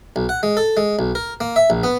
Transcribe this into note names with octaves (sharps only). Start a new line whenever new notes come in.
B1
F#5
G#3
A4
G#3
B1
A#4
A#3
E5
A#1
B3